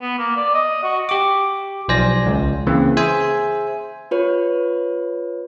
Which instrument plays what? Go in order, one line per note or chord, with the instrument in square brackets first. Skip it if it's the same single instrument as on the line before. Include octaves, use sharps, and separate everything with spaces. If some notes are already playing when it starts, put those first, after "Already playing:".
[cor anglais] B3
A#3
D5
D#5
F#4
[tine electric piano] G4 D6
B1 F3 C5 D5 G#5 A#6
C#2
C#3 E3 A#3 C4
G#4 C5 E5 G#5
[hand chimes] F4 B4 C#5